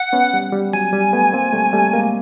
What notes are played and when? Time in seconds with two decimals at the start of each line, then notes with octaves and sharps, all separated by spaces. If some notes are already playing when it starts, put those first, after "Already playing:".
Already playing: F#5
0.13 B3 C#4
0.34 G3
0.53 G3
0.73 F#3 G#5
0.92 G3
1.13 A3 B3
1.33 A#3 C4
1.53 G3 A3
1.73 G3 A3
1.93 G#3 A#3